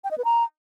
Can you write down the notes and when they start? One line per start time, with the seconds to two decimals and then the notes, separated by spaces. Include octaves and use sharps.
0.04 G5
0.11 D#5
0.18 B4
0.25 A#5